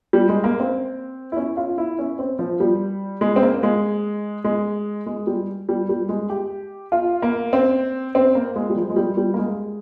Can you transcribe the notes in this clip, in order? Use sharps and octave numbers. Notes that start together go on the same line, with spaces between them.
G3
G#3
A#3
C4
E4
C#4
F4
E4
C#4
C4
F3
G3
G#3
C4
A#3
G#3
G#3
G#3
G3
G3
G3
G#3
G4
F4
A#3
C4
C4
A#3
G#3
G3
F3
G#3
G3
G3
A#3
G#3